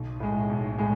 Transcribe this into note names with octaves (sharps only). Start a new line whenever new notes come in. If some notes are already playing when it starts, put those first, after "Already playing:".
Already playing: B1
A2 G#3
B1
A2 G#3